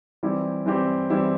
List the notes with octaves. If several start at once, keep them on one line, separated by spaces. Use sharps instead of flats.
E3 G3 C4 E4 G4
E3 G3 C4 E4 G4
E3 G3 C4 E4 G4